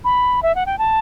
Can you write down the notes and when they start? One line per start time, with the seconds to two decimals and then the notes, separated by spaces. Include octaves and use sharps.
0.04 B5
0.42 E5
0.55 F#5
0.66 G5
0.78 A5